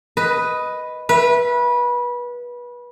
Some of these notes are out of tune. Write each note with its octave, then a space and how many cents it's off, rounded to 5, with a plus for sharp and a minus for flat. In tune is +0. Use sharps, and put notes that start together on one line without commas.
B4 +0 D#5 +5
B4 -25 E5 +15